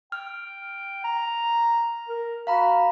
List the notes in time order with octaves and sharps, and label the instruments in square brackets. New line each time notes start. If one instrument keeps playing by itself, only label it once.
[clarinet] G5 [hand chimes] F6
[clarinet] A#5
A#4
[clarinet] F#4 [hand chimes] F5 A#5 B5